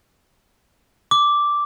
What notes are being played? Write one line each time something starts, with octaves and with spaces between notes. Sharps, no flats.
D6